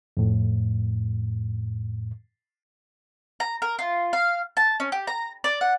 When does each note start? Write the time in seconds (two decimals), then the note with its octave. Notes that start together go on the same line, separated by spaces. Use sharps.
0.17 F2 A2
3.40 A#5
3.62 A#4
3.79 F4
4.13 F5
4.57 A5
4.80 C#4
4.92 G4
5.07 A#5
5.44 D5
5.61 F#5